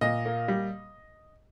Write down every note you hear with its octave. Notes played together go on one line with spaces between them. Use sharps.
A#2 D#5
A#3
G3